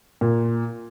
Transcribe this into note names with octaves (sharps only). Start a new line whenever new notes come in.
A#2